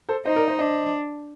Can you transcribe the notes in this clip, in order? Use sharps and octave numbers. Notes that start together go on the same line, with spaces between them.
A4 C5
D#4 C5 D#5
A#4 D5
C5 D#5
D4 C5 D#5